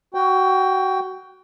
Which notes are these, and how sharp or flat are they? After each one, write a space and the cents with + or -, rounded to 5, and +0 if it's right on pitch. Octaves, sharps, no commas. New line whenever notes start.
F#4 +20 G5 +0